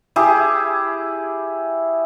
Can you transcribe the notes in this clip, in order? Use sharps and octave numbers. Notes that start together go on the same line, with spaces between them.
E4 G4 G#4